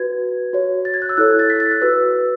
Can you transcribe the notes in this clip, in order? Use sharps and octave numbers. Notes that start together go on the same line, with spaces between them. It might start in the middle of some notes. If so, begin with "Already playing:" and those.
Already playing: F#4 B4 G#6
F#4 C#5
A6
G#6
F#6
E6
E4 A4 C#5 F#6
A6
B6
A6
F#6
F#4 B4 E6